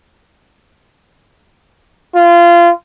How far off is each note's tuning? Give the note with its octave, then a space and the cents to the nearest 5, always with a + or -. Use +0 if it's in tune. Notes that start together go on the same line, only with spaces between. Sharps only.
F4 -25